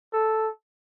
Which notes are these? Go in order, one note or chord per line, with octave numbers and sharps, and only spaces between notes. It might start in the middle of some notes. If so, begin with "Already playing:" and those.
A4